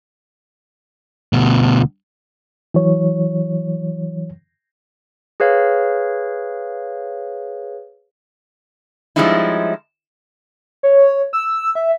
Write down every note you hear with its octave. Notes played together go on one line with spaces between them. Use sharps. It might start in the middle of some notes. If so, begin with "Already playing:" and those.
D2 B2
E3 F#3 C#5
G#4 B4 C#5 F5
F3 G3 G#3 C#4 D#4 E4
C#5
E6
E5